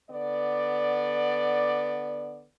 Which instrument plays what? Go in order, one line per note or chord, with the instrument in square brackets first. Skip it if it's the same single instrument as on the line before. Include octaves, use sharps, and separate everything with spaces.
[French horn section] D3 B3 D5